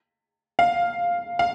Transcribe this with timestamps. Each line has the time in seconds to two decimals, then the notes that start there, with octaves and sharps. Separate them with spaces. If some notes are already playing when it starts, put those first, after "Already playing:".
0.59 F5
1.39 F5